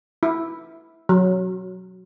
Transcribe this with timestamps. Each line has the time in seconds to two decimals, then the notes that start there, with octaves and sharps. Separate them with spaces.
0.23 E4
1.09 F#3